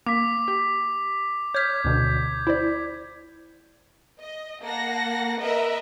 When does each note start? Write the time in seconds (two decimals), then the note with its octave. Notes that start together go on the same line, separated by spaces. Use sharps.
0.07 A#3 D6 B6
0.48 G4
1.55 C#5 F6 G6 G#6 B6
1.85 D2 B2 D3
2.47 E4 C5 D5
4.20 D#5
4.63 A#3 F#5 A5 A#6
5.40 A#4 B4 D#5 E5